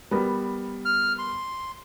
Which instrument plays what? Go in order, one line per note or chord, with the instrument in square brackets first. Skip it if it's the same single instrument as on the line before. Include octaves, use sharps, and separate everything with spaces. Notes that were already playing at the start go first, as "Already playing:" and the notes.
[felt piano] G3 B3 A#4
[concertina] F6
C6